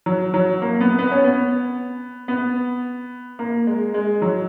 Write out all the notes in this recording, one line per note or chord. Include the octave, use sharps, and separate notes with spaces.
F#3
F#3
A#3
B3
B3
C#4
B3
B3
A#3
G#3
G#3
F#3